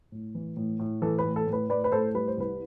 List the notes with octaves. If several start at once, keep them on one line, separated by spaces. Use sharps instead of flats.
A2
E3
A2
A2
E3 A4
B4
A2
A4
A2
B4
A2 B4 D5
B4
A2 A4 C5
G3 B4
C5
C2 B4